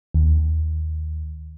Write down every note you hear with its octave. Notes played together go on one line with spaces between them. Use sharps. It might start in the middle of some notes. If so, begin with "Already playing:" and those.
D#2